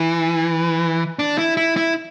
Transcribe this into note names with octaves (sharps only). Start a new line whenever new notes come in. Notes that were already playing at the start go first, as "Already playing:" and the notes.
Already playing: E3
D4
E4
E4
E4